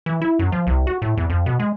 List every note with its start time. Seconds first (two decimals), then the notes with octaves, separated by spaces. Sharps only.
0.06 E3
0.22 E4
0.39 F#2
0.52 F3
0.67 C2
0.87 F#4
1.02 A2
1.17 E2
1.30 F2
1.46 B2
1.60 G#3